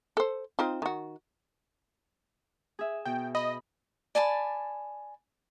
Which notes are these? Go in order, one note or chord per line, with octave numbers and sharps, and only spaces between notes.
A4 C5
C4 D#4 F4
D#3 F#4
G#4 E5
B2 G5
D#5 B5
D5 G#5 A5 B5